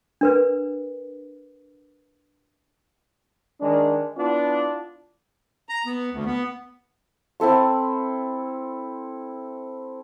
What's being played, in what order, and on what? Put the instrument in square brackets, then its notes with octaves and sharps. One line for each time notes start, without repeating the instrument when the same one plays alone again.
[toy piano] D4 A#4 B4
[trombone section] D#3 G#3 D4
B3 D4 E4 F4
[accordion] A#5
B3
D2
B3
[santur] C4 E4 A4 C6